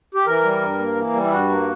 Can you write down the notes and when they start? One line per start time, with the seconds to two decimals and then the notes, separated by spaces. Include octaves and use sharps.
0.15 G4
0.26 E3 A#4
0.43 G3
0.62 G2
0.79 A#3
0.96 E3
1.13 G3
1.24 E4
1.31 G2 F#4
1.49 A#3